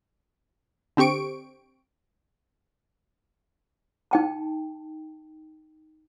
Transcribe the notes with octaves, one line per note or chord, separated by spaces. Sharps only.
D3 C4 G4 C#6 D7
D#4 G5 A5